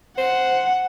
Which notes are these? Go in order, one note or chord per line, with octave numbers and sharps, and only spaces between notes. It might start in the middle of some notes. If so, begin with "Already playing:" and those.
C5 F#5